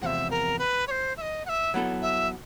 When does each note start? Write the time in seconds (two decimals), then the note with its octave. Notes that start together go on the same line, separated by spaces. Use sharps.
0.02 E2 C3 F3 G#3 E5 F#5
0.31 A#4
0.59 B4
0.87 C#5
0.91 C5
1.17 E5
1.21 D#5
1.45 F#5
1.49 E5
1.74 F#3 B3 E4 A4
2.02 E5